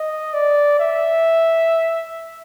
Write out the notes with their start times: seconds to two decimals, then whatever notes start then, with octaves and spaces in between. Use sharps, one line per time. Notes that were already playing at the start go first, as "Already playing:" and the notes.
Already playing: D#5
0.34 D5
0.80 E5